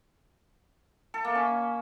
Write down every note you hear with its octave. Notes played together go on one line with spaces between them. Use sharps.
A4
A#3
C#4